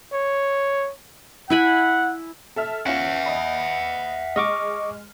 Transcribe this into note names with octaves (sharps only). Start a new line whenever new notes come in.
C#5
E4 F#5 G#5 B5
A4 E5 F6
C#4 F4 E5 F#5
D#5 B5
G#3 D#5 C#6 D6 F6